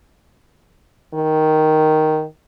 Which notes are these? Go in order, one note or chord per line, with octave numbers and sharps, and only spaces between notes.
D#3